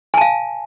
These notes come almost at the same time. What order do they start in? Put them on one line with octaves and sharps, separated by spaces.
G#5 A5 F5